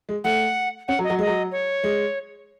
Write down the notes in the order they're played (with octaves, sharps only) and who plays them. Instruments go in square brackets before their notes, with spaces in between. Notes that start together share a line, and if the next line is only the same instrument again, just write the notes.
[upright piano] G#3
[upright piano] A3 [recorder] F#5
[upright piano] C#4 [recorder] F#5
[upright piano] F#3
[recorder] D#5
[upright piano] F#3
[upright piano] G#3 [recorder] D#5
[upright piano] F#3
[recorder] C#5
[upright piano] G#3